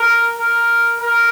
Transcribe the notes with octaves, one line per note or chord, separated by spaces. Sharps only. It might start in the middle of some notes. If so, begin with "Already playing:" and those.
Already playing: A#4
A#4
A#4